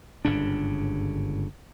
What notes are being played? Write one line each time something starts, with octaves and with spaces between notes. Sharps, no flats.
G1 G#2 C#3 D4